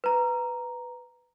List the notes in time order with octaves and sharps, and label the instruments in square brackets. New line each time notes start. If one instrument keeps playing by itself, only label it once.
[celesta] B4 A#5